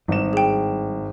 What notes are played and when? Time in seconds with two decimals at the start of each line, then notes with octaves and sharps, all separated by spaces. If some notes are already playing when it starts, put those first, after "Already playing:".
0.08 G#1 G2 E7
0.33 G#4 G5